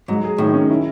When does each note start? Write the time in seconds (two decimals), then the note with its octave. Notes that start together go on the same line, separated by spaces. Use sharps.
0.08 G#2 F#3
0.24 G#4
0.38 A2 D#3
0.54 C#4
0.70 E4